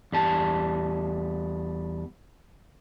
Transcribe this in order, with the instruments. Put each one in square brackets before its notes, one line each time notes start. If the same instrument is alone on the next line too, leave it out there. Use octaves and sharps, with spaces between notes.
[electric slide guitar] E2 G3 A5